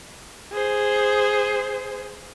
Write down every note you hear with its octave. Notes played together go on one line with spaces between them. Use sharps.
G#4 C5